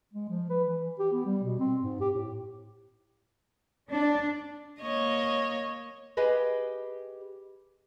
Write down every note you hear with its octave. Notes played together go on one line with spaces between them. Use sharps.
G#3
F3
B4
E3
G4
B3
G3
B2
C4
G#2
G4
A2
D4
A#3 C#5 D#5
G4 G#4 B4 D#5 F5